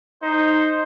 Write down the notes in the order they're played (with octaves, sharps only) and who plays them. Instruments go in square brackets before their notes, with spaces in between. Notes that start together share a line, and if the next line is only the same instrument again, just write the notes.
[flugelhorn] D#4 [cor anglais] C5